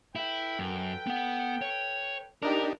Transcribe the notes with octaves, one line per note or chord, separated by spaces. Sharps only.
E4 A4 B4 G5
F#2
B3 F#5
C#5
D4 D#4 G4 A#4